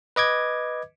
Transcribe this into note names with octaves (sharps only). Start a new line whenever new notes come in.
B4 D#5 D6 G#6